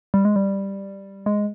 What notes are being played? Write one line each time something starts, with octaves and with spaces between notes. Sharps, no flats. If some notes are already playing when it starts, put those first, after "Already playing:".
G3
G#3
G3
G#3